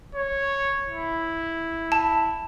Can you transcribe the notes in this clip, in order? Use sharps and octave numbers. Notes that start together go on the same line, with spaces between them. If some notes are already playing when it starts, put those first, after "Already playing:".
C#5
E4
A5